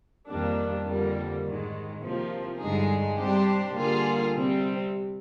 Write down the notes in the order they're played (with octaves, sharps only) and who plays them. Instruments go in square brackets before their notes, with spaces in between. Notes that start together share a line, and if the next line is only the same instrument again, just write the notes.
[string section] F2 D#3 G3 A#3 D4
F2 D3 G3 A#3
G#2 D#3 G#3
C3 F3 A#3
G2 D3 G#3 D#4 G#4
C3 G3 D4 G4 C5
D3 G3 A#3 F4 G#4
C3 G3 C4